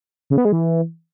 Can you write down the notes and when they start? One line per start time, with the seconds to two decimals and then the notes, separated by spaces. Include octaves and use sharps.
0.30 C#3
0.38 B3
0.45 G#3
0.52 E3